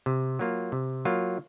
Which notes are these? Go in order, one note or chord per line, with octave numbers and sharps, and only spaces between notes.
C3
F#3 A#3 F4
C3
F#3 A#3 F4